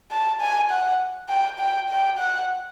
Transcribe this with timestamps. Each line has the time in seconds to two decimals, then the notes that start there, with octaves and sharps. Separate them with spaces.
0.11 A5
0.41 G#5
0.70 F#5
1.29 G5
1.59 G5
1.89 G5
2.18 F#5